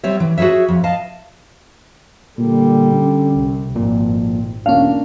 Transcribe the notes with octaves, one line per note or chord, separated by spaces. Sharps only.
G3 C4 C#5 E5
E3
F#4 G#4 A4 C#5 E5
F2
D#5 F5 A5
A#2 D3 G3
C#4
C2
G#1 F2 A#2
E1 A#3 C#4 D4 F5